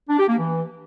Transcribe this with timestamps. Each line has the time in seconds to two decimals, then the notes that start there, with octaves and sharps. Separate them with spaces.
0.09 D4
0.19 G4
0.29 A#3
0.38 E3